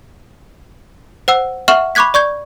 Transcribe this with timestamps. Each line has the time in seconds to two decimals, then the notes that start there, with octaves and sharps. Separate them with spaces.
1.28 C5 F#5 E6
1.68 E5 F#5 C#6 F6 E7 F#7
1.95 B5 C#6 D6 F#6 G#6 B6
2.14 D5 C#6 G6 G#6